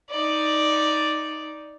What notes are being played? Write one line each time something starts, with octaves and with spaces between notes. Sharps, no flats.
D#4 D5